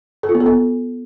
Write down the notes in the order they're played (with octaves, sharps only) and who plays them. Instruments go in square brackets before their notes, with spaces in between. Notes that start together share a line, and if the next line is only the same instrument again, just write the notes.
[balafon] A4
F4
B3
A4
B3